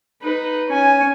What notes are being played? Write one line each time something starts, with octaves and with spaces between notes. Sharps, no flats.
D#4 B4
C#4 G#5